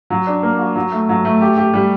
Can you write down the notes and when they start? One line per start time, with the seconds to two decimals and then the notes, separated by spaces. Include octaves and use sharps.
0.10 F#3
0.27 D4
0.43 A#3
0.59 F#4
0.76 F#3
0.92 A3
1.09 F#3
1.25 A3
1.41 G4
1.57 G4
1.74 G3